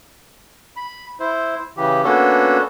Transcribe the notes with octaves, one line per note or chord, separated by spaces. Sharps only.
B5
E4 C5
C#3 E3 G4
A#3 B3 C#4 D4 F#4 A4